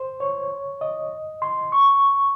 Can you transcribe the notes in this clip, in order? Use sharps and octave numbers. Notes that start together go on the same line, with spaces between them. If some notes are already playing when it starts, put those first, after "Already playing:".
Already playing: C5
C#5
D#5
C6
C#6